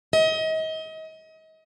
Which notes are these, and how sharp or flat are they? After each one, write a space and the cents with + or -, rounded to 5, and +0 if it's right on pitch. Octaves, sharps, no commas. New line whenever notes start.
D#5 +35